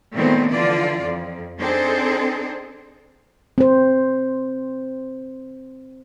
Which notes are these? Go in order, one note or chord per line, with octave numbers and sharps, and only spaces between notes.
A#2 D#3 G#3 A3 B3 C4
D3 E3 F3 F4 D5
F2
C4 D4 D#4 G#4 A4 C5
C4 C5